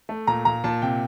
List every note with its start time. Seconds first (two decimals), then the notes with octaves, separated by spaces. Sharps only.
0.09 A3
0.27 A#2 A#5
0.45 A#2 A#5
0.64 A#2 A5
0.82 C3 G5